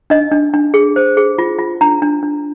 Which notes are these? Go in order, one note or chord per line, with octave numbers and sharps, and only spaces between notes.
D4 D#5
D4
D4
G#4
C5
G#4
F4
F4
D4 A#5
D4
D4